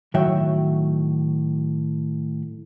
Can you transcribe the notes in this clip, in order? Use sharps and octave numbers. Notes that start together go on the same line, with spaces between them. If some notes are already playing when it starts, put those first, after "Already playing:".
A2 D#3 F#3 F#4 E5 G5